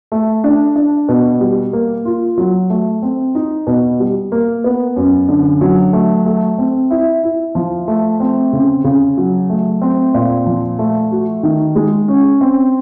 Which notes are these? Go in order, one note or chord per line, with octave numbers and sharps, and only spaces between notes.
A3
D4
D4
B2
G3
A#3
F4
F#3
A3
C4
D#4
B2
G3
A#3
B3
F#2
D3
F#3
A3
A3
C4
E4
E4
F3
A3
C4
C#3
C#3
F#3
A3
C4
A#2
F3
A3
F#4
D#3
G#3
C#4
C4